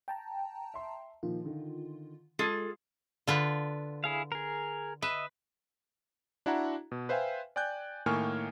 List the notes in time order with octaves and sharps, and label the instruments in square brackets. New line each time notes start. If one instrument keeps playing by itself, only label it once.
[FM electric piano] G5 A5 A#5
[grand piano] E5 C6
[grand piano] A#2 D#3 F3 [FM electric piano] F4
[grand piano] D3 D#3
[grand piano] G#3 [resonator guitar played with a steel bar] F4 G#4 A4
[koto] D3 F4 B4
[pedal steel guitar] E4 G#4 F5
G#4 A#4
[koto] B4 [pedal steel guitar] D#5 E5
[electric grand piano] D4 E4 F#4 F#5 A#5
B2
B4 C5 E5 F5 G5 G#5
D5 G5 G#5 F#6 G6
A2 D#3 A#3 G#5 C#6 F6